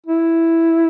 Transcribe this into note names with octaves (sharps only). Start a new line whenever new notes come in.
E4